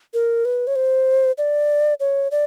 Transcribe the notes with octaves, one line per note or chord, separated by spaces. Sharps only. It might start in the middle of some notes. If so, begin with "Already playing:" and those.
A#4
B4
C#5
C5
D5
C#5
D5